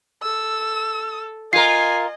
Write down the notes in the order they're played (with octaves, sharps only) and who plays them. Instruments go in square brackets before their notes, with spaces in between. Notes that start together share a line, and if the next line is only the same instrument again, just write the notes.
[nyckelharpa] A4 [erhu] E6
[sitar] F4 A#4 [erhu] D#5 [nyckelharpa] G#5 [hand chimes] C7